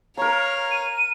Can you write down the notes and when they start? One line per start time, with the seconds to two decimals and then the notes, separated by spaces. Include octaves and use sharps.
0.17 A#4 C#5 F5 A#5
0.71 D#7